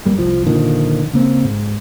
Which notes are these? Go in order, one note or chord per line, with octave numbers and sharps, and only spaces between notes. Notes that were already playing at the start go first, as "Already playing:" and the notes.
G2 G3 A#3
C2 F3
A#2 D3 D#3 F3
C#3 A#3 C4
G#2